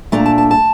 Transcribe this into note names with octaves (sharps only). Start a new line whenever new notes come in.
A#2 A3 D4 A#5
A5
A5
A5